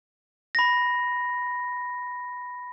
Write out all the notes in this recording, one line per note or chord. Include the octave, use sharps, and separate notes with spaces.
B5 A#6